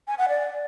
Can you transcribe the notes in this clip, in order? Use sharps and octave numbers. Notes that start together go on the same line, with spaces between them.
G#5
F#5
D5